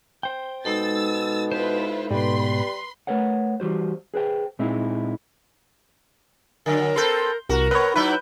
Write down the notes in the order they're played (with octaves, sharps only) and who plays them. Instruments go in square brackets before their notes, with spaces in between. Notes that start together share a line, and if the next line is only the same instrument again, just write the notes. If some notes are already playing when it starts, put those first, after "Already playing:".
[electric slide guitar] C5 G5
[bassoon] B2 [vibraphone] G#3 D#4 A4 [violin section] E6 A6
[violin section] E4 F4 B4 [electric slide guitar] C5
[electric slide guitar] G#2 B2 [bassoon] G3 [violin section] B4 B5 C6
[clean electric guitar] A3 A#4 B4 C#5 F#5
E3 G3 F#4 C5
G#4 B4 C5 G5
A#2 G#3 C4 D#4 E4
[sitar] D3 F#3 [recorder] A#4
[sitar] C4 A4 B4 [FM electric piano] C6 G6
[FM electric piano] C2 [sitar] F#4 [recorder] A#4
[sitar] B3 [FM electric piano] B4 C#5
[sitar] F#3 E4 [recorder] D#4 [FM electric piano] B4 G6